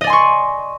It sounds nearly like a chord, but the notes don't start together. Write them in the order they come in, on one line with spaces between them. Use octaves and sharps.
D#5 D5 G#5 C6 C#6